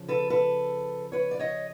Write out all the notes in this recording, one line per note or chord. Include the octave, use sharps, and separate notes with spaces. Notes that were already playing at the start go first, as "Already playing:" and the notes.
Already playing: C#3 F3
A4 B4
A4 B4
B4 C#5
D5
C#5 D#5